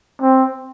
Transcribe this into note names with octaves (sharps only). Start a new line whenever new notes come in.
C4